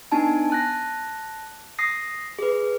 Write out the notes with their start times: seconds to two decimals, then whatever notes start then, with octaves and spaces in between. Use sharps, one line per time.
0.12 B3 D4 D#4 G#5 A5
0.50 A5 F#6 A#6
1.79 D#6 A#6 C7
2.39 G#4 B4